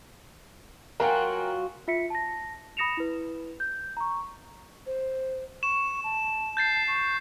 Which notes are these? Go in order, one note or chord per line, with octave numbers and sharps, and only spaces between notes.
F#3 F4 F#4 A#4 G5 G#5
F4 E5 B6 C#7
A5 A#6
B5 D#6 A#6 C#7 E7 F7
E4 B4
G6
A#5 C#6
C5
C#6 E7
A5
G6 A6 C7
C#6